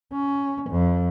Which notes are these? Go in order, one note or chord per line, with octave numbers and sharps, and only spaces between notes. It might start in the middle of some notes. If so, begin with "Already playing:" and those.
C#4
F2